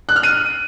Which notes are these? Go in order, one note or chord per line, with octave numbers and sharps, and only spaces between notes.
F#6
F6
D#7